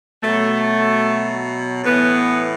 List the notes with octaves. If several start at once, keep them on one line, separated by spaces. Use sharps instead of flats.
B2 F#3 A3
A2 E3 B3